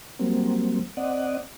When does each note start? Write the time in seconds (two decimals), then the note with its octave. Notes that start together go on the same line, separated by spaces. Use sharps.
0.19 F#3 G3 A#3 C4
0.97 C4 D5 D#5 F#5